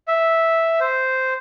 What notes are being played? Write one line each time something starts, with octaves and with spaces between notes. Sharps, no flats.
E5
C5